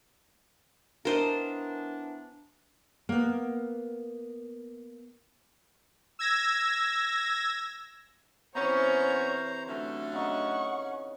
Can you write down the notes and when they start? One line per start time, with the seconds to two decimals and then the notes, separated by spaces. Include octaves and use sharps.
1.05 E3 B3 D4 A#4 C5 D#5
3.09 A#3 B3
6.19 E6 G#6 A#6
8.55 C3 E3 B3 C#4 C5 C#5 A#5
9.68 D3 F#3 A3 C#4
10.13 C#3 D#4 D#5 F#5 C#6